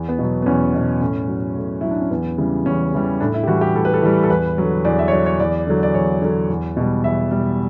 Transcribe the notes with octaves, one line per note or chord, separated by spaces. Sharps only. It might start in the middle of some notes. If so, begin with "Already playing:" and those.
Already playing: E2
B3
B2 F#3
B3
E2 C#4
B2 F#3
A2 C#4
F#3
A2
F#3 E4
D4
C#4
E2 B3
C#3 E3 G3
E2 C#4
C#3 E3 G3
A2 D4
E4
G4
E3 G3 F#4
G4
A2 A4
B4
A4
E3 G3
A4
E2 B4
D3 F#3
E2 D5
E5
C#5
D3 F#3 D5
C#5
E2 D5
D3 F#3
D5
E2 C#5
D3 F#3
E2
B2 G3
E2 E5
B2 G3